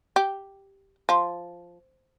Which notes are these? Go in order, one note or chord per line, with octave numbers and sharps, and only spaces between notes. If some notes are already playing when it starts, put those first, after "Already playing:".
G4
F3